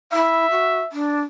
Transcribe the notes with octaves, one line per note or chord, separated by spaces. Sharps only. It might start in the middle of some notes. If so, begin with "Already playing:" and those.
E4 E5
F#4
D4